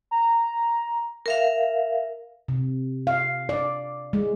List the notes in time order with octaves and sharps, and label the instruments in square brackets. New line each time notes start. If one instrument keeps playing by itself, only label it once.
[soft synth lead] A#5
[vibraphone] A#4 E5 F5
[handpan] C3
F5
D5
G#3